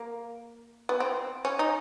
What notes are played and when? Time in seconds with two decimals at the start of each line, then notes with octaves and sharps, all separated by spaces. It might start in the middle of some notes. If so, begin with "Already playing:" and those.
Already playing: A#3
0.89 B3
1.00 C4
1.45 C#4
1.59 D#4